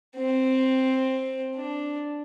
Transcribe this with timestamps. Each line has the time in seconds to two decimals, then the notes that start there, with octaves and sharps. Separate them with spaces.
0.17 C4
1.56 D4